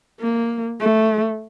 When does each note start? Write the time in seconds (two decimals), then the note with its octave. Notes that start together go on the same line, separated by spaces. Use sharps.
0.20 A#3
0.80 A3